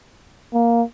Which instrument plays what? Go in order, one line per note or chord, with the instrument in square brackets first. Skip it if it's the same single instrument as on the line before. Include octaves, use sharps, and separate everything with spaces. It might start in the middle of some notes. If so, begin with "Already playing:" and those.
[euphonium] A#3